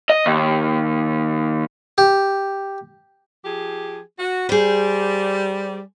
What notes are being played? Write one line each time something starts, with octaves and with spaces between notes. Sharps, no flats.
D#5
D#2
G4
F3 G4 G#4
F#4
G3 G#4 C5